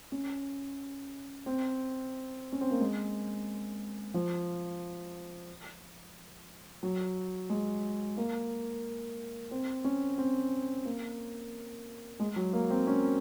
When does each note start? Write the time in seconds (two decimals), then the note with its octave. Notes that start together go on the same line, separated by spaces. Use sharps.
0.12 C#4
1.46 C4
2.52 C#4
2.61 C4
2.71 A#3
2.80 G#3
4.14 F3
6.83 F#3
7.50 G#3
8.17 A#3
9.51 C4
9.84 C#4
10.18 C4
10.85 A#3
12.20 G#3
12.36 F#3
12.53 A#3
12.70 C4
12.87 C#4